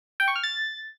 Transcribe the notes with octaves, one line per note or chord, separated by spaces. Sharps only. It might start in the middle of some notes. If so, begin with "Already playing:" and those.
G5
C#6
F6
A6